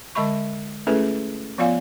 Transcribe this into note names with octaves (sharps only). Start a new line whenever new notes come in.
D3 G#3 D#5 E5 B5 C#6
A3 C#4 E4 G#4 A4 B4
F3 B3 F4 D5 F5 G#5